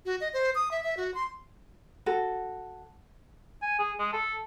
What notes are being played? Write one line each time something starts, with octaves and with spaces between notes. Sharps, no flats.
F#4
D#5
C5
D#6
E5
E5
F#4
C6
F#4 A4
G#5
G#4
G#3
A4